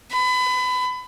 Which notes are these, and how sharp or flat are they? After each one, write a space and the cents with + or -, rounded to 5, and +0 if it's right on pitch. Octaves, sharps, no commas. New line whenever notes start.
B5 +30